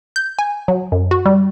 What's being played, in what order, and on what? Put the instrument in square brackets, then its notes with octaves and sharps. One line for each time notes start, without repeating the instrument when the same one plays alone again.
[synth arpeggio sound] G6
G#5
F#3
F#2
F#4
G3